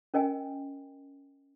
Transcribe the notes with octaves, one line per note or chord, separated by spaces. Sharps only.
C#4 A#4 D#5 G5 G#5